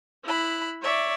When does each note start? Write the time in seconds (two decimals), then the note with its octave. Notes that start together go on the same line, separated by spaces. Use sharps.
0.24 E4 B5 F#6
0.82 C#5 D5 E5